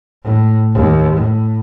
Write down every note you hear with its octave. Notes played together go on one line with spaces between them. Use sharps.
A2
D#2
A2